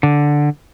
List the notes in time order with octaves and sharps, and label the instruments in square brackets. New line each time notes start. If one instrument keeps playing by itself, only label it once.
[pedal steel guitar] D3